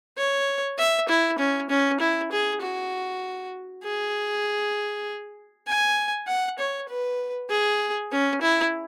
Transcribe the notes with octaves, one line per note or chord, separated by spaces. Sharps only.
C#5
E5
E4
C#4
C#4
E4
G#4
F#4
G#4
G#5
F#5
C#5
B4
G#4
C#4
E4